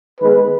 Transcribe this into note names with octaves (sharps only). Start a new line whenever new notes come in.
D#3 G#3 B3 B4